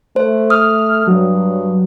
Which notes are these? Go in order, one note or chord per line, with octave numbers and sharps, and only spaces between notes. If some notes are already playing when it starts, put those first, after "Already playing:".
A3 C5
D#6 F6
G2 F#3